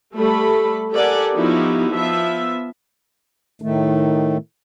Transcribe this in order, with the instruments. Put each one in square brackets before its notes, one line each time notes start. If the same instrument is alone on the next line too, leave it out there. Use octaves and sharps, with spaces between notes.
[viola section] G3 A3 A4 B5
G4 A4 A#4 D5 F#5 G#5
F3 B3 D#4 E4 F#4 G4
F3 B3 E5
[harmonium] A2 D#3 A3